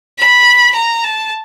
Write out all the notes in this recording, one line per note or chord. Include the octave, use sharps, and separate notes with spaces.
B5
A#5
A5